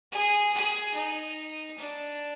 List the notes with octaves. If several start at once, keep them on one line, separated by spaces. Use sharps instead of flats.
G#4
G#4
D#4
D4